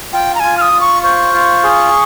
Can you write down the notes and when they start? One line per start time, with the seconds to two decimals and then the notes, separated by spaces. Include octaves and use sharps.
0.13 F4 G5
0.35 A#5
0.40 F4 G#5
0.58 F6
0.61 D#6
0.73 F4
0.81 C#6
1.03 C5 C#6
1.34 F4
1.63 G#4